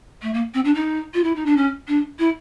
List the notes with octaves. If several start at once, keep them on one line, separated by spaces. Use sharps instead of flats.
A3
A#3
C4
D4
D#4
F4
E4
D#4
D4
C#4
D4
E4